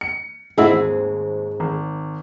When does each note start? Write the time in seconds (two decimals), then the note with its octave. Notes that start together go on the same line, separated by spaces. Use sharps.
0.01 C#7
0.58 G#2 C4 D#4 E4 F#4 G#4
0.71 D#2
1.60 G#1